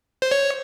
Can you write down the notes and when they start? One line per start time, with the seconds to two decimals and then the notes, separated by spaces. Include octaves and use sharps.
0.22 C5
0.31 C#5